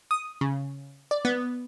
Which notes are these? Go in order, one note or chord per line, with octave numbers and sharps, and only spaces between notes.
D#6
C#3
D5
B3